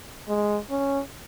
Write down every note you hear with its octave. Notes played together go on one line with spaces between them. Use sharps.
G#3
C#4